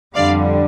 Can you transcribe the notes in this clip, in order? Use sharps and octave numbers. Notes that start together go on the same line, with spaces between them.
F2 D3 G3 D4 D5 F5